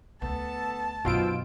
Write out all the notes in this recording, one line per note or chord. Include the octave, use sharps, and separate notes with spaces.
D2 B3 A4 A5
F#2 B2 D#3 F3 F4 G5 E6 D7